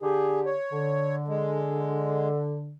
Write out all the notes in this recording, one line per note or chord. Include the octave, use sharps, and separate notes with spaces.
D3 G4 G#4
C#5
D3
G#3